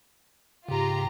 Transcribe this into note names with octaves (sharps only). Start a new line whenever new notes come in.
G#2 C#3 F4 G4 A#5